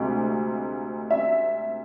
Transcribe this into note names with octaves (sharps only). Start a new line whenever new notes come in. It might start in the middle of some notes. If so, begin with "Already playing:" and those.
Already playing: D2 C3 G#3
E5